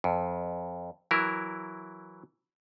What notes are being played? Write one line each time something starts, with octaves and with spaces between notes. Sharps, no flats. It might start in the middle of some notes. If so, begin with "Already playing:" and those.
F2
E3 F#3 E4 A#4